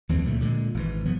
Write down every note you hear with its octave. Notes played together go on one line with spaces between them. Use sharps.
D#2 E3 F#3 C4
C#2 A#2 D3 A3
A#2 D3 E3 G#3
G#1 G#2 E3
F3 F#3 B3